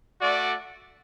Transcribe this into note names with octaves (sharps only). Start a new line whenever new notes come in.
A3 F#4 D5